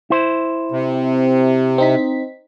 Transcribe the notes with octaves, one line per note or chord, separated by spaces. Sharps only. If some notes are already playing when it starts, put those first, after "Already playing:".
E4 C5
C3
C4 D#4 B6